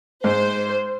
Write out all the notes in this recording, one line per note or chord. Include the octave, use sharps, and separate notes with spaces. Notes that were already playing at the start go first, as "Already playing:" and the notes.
G#2 C5